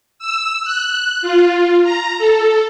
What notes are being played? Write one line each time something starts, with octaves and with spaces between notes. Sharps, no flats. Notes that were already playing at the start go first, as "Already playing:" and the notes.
E6
F#6
F4
A#5
A4